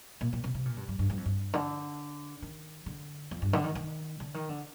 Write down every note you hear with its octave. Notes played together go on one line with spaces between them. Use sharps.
A#2
A#2
C3
C3
A#2
G2
G2
G2
G2
F2
G2
D3
D#3
D3
F2
G2
D3
D#3
D#3
D3
D#3
D3